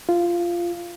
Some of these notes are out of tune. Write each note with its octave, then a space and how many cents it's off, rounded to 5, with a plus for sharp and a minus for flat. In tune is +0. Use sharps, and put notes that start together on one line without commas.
F4 -10